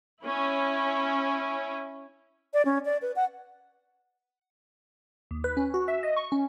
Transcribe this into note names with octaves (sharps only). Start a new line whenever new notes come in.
C#4 E4
D5
C#4
D5
B4
F#5
D#2
B4
C#4
F#4
E5
D#5
C#6
C#4